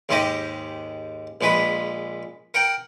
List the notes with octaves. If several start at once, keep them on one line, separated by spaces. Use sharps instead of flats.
D#2 G#2 G#3 G4 D#5
A#1 A#2 G#3 B4 B5
A#4 F#5 G5